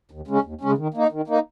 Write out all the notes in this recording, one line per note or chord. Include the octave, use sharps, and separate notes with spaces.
D#2
C#3 G#3 C#4
D#2
C#3 G#3 C#4
D#3
A#3 D#4
D#3
A#3 D#4